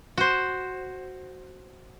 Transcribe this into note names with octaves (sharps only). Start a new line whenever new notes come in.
F#4 C5